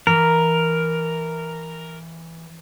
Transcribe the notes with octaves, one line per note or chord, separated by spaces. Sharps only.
E3 A#4